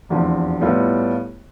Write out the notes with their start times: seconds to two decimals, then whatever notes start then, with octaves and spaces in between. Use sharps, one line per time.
0.09 F1 E2 D3 F3
0.61 A2 G3 B3 F4